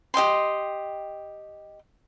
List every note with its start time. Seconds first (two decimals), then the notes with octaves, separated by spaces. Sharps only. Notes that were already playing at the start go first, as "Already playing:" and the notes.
0.14 G4 D#5 G5 C6